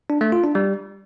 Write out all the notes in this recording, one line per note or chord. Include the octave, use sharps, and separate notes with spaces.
D4
A3
F4
D4
G3